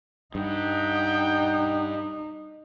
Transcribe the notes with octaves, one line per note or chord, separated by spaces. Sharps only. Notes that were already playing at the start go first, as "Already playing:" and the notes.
G2 D#4 F#5 G5